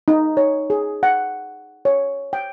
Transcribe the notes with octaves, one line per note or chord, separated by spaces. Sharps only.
D#4
C#5
G#4
F#5
C#5
G5